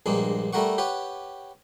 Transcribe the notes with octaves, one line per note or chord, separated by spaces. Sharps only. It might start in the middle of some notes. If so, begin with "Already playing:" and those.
A#1 G2 G#3 A#3
G3 A3 E4 A#4 F#5 C#6
G4 B4 C#5 F#5